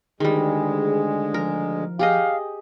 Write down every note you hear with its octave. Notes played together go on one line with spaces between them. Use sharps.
D2 D#3 G3 G#3 G#4
F3 A#4
G4 G#4 D#5 F5